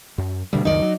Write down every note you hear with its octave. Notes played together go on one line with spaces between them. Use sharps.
F#2
D2 B2 D3 G3
C#2 F#2 D#3 D#4 D5
F#3